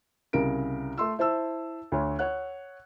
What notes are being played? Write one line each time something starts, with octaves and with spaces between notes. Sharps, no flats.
C2 C#3 A#4 D7
A3 C6 E6
E4 C5 A5 E6
D2 C#5
C#5 F#5 F#6